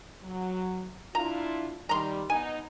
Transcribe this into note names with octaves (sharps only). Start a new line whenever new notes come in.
F#3
D4 E4 F4 A#5
D#3 G3 A#5 C6
B3 D#4 G#5